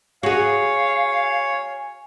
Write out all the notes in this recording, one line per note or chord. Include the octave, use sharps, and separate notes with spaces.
F#4 G#4 C#5 F5 G#5